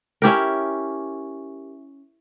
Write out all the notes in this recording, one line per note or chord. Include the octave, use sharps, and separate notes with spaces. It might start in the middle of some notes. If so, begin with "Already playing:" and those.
C#4 E4 G4 A#4